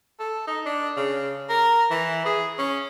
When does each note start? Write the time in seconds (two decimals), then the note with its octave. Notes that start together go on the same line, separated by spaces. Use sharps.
0.19 A4
0.47 D#4
0.66 D4
0.97 C#3
1.49 A#4
1.91 E3
2.26 G#4
2.58 C#4